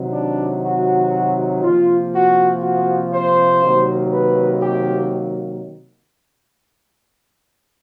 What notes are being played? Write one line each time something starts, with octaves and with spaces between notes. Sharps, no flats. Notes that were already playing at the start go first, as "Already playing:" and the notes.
Already playing: C3 D#3 F#3
D4
F#4
C3 F3 A#3 F4
F#4
F#4
C5
C3 D#3 F#3 A#3
B4
G4